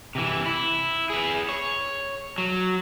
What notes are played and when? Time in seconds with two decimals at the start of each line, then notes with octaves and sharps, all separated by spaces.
0.15 C3 E3
0.46 E4
1.10 G#4 B4
1.49 C#5
2.38 F#3